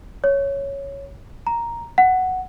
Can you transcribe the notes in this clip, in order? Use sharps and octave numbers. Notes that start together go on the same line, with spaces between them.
C#5
A#5
F#5